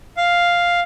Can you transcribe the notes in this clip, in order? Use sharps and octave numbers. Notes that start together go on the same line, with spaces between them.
F5